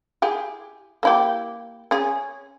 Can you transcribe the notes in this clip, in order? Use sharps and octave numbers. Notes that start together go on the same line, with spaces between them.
E4 G4 G#4
A#3 E4 G4
C#4 G#4